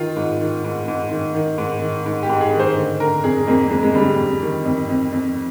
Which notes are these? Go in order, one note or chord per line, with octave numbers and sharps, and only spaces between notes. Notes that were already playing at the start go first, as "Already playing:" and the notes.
Already playing: D#3 F4
G#2
D#3
G#2
G#2
D#3
D#3
G#2
D#3
G#2
G4
G#2
G#4
D#3
C5
D3
D3 A#4
F2 G#4
F2 A#3
F2 G#3
G#3
D3 G3
F2
D#3
F2
F2
F2